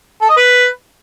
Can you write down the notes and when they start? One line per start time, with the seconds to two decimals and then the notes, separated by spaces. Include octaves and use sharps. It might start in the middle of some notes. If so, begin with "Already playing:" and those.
0.21 A4
0.29 D#5
0.37 B4